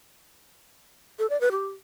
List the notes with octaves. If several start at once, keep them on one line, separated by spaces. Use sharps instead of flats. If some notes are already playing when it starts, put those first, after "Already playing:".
A4
D5
B4
G4